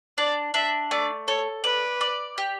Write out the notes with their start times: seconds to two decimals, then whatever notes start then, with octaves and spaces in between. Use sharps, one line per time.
0.18 D4 D5
0.54 D4 E5
0.91 A3 D5
1.28 A4 C#5
1.64 B4 D5
2.01 D5
2.38 G4